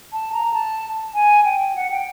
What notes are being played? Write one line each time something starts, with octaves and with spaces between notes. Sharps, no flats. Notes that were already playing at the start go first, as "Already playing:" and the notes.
A5
A#5
A5
G#5
G5
F#5
G5